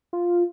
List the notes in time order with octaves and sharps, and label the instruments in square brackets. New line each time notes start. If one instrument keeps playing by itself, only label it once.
[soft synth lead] F4